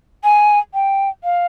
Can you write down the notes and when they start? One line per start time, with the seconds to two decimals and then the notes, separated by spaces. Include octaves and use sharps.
0.24 G#5
0.74 G5
1.24 F5